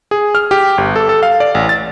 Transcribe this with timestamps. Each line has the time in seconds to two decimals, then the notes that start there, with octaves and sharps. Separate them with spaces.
0.11 G#4
0.35 F6
0.51 G4
0.78 G1
0.96 A4
1.09 A4
1.23 F5
1.40 D5
1.55 A1
1.69 A6